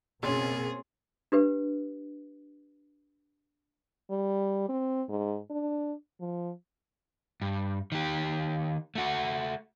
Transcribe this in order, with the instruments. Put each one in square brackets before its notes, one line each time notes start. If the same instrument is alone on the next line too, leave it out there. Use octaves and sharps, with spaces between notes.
[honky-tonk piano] F#1 C#4 [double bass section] B2 A#3 C4 [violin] G#4 [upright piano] C#5 C6
[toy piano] D4 G4 B4
[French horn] G3
C4
G#2
D4
F3
[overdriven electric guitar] G2
D#3 G4
A3 F#4